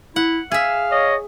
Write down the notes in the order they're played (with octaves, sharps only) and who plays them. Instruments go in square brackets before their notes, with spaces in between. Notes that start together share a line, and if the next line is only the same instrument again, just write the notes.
[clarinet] E4 [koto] F#5
[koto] G#4 E5 [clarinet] F5
[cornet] C#5 [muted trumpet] D#5